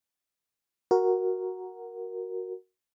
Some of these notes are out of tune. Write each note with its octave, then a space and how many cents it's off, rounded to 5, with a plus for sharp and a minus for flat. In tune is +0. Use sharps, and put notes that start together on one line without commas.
F#4 +0 A#4 +0